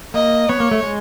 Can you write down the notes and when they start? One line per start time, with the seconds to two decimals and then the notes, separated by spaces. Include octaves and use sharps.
0.14 A#3 D#5
0.49 B3 C#5
0.60 A#3
0.71 A3
0.83 G#3